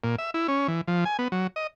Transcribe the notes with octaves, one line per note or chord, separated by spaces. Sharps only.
A#2
E5
E4
C#4
E3
F3
G#5
B3
F#3
D#5